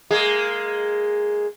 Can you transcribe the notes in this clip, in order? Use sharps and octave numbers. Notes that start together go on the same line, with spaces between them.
G#3 A#3 G#4